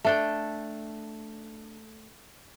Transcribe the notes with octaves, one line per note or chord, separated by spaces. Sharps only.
A3 D4 G5